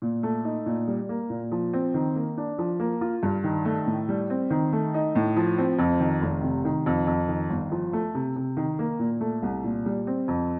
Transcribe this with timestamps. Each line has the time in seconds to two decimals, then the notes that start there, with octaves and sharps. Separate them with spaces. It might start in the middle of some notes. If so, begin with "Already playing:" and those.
0.02 A#2
0.23 A3
0.45 D#4
0.66 A#2
0.88 G3
1.09 A#3
1.30 A#2
1.52 F3
1.73 C4
1.94 D#3
2.16 A#3
2.37 D4
2.59 F3
2.80 A#3
3.01 F4
3.23 G2
3.44 D#3
3.65 A3
3.87 A2
4.09 G3
4.30 C4
4.50 D#3
4.73 A3
4.94 D#4
5.15 A2
5.37 F3
5.58 C4
5.79 F2
6.00 D#3
6.22 F1
6.43 C3
6.65 D#3
6.86 F2
7.07 F2
7.28 D#3
7.50 G1
7.72 F3
7.93 A3
8.15 C3
8.36 C3
8.57 D#3
8.79 A#3
8.99 A#2
9.21 A3
9.42 C2
9.64 A#2
9.86 G3
10.07 C4
10.28 F2